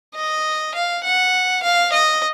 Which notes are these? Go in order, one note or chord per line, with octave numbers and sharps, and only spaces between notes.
D#5
F5
F#5
F5
D#5